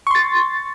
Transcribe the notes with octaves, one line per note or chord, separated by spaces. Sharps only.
C6 C#6 A6